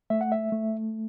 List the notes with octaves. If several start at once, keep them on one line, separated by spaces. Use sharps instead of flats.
A3 E5
F#5
E5
A3